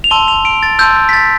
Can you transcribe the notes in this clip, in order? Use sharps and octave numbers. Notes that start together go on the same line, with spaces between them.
F7
A5 C6 E6 G7
F7
D7
A6
A5 C6 E6 G6
G6
B6
A6